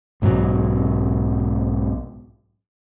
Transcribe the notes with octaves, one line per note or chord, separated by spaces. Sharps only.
B1 G#2 B2 F#3